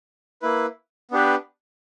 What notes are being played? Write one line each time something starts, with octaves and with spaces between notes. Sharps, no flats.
A#3 E4 B4
B3 D4 G4 B4